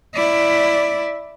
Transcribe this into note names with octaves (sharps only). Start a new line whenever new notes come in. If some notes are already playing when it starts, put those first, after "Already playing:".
E4 D5